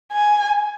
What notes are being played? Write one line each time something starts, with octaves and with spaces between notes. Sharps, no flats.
G#5